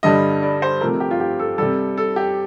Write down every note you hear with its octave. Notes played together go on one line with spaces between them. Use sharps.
G2 D3 G3 D#5
D5
C5
C3 F3 A3 A#4
G4
F4
G4
A4
C3 G3 A4
A4
G4